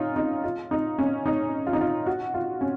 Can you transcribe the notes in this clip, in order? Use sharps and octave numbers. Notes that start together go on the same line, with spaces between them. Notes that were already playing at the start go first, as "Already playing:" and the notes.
Already playing: C#4 D#4 F4
D#4
F4
D#4
C#4
D#4
F4
D#4
F4
F#4
F4
C#4